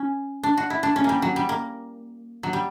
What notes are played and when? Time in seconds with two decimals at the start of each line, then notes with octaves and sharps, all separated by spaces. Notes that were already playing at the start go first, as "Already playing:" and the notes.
Already playing: C#4
0.43 D4
0.57 F#4
0.70 E4
0.83 D4
0.96 C#4
1.04 G3 A#3
1.22 F#3
1.36 G3
1.49 A#3
2.43 F#3
2.53 G3